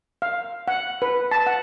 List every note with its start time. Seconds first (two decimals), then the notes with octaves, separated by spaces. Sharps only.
0.22 F5
0.68 F#5
1.02 B4
1.31 A5
1.47 F#5